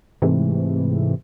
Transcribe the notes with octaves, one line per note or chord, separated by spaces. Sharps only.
G#2 C3 E3 A3